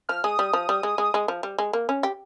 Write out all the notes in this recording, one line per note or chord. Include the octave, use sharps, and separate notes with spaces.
F3 F6
G#3 D#6
G3
F3
G3
G#3
G#3
G#3
F3
G3
G#3
A#3
C#4
G4